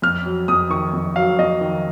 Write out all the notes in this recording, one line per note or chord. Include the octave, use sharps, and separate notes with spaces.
F2 F6
F#3
F2 D#6
D#3 C#6
F2
F#3 F5
F2 D#5
D#3